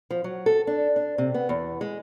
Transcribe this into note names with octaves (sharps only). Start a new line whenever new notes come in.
F3
F#3
A4
D4
D4
C3
B3
E2
G#3